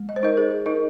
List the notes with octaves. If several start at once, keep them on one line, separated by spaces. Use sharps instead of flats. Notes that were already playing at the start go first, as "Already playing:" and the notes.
Already playing: G#3
D#5
C5
D#4 A#4 D#5
G#4 C5
D#4 A#4 D#5